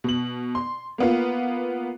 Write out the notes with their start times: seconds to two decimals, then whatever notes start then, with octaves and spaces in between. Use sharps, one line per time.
0.04 B2 F#7
0.55 C6
0.98 A#3 B3 F4